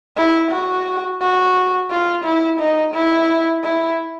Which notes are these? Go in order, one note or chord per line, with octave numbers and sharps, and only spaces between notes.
E4
F#4
F#4
F4
E4
D#4
E4
E4